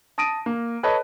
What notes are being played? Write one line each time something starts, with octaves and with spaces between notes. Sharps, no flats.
A5 D#6 A#6 D7 D#7
A#3
A4 B4 C#5 D#5 A5 B5